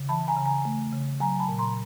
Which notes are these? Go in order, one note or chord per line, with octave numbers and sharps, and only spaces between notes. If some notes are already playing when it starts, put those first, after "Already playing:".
Already playing: C#3
E3 A5 B5
G#5 A#5
C#3
G#5 A#5
A3
C#3
F#3 G#5 A#5
A5 B5
A#2
A#5 C6